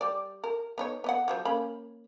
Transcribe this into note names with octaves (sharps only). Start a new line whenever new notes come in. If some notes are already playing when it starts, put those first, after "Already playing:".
G3 D5
A#4
B3 D#4 C#5
B3 D#5 F#5
F3 F#3 C5
A#3 C#4 B5